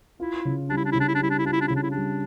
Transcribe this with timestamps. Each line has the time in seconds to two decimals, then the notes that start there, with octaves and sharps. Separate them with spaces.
0.20 E4 F4
0.45 C#3
0.69 G3 D4
0.77 E4
0.84 D4
0.92 E4
0.95 C#3
1.00 D4
1.08 E4
1.15 D4
1.20 G3 E4
1.30 D4
1.38 E4
1.45 D4 F4
1.53 E4
1.61 D4
1.68 C#3 E4
1.76 D4
1.83 E4
1.90 G3 D4